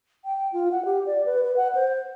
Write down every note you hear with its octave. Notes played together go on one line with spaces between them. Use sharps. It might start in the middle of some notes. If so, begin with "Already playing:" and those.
G5
F4
F#5
G4
D5
B4
B4
F#5
C5